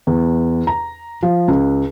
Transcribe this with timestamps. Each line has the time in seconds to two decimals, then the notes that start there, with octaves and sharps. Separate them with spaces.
0.07 E2
0.67 A#5
1.23 F3
1.48 C#2